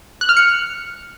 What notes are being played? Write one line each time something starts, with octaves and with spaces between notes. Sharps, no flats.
F#6
F6
C#7